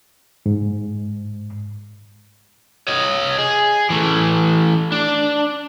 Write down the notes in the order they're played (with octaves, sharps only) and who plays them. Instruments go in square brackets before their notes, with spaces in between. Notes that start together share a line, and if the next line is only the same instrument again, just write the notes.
[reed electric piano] G#2
[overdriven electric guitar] C#5 D#5
G#4
E3 A3
D4